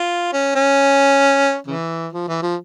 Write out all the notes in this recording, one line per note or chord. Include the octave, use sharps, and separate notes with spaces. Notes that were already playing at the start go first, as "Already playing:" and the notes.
Already playing: F4
C#4
C#4
C#3 E3
F3
E3
F3